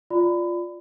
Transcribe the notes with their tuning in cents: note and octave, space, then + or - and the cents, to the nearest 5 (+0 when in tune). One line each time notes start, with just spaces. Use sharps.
F4 +0 D5 +0 B5 +30